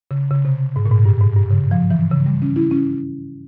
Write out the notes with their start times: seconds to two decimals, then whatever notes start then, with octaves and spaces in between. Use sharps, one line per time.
0.11 C#3
0.31 C#3
0.45 C3
0.76 G#2
0.86 A#2
0.91 G#2
1.06 G2
1.21 G#2
1.36 G2
1.51 C#3
1.71 F3
1.91 E3
2.11 C#3
2.26 G3
2.42 C#4
2.56 E4
2.71 C#4